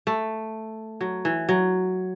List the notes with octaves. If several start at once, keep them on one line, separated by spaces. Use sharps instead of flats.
A3
F#3
E3
F#3